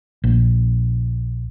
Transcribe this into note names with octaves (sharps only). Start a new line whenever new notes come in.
A#1